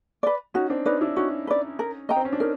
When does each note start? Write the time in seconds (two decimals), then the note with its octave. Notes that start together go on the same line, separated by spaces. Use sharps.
0.23 B4 D5
0.54 C#4 D#4 F#4
0.70 C4 D4
0.85 C#4 D#4 B4 D5
1.01 D4 E4
1.16 C#4 D#4 F#4
1.47 B4 D5
1.79 A#4
2.09 D#5 G5 A#5
2.17 C4
2.25 C#4
2.33 D4
2.40 C#4 D#4 A#4